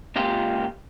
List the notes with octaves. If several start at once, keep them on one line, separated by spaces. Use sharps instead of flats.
C#2 A#2 F4 G4